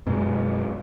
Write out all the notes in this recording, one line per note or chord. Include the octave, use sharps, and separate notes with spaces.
F#2 B2 G#3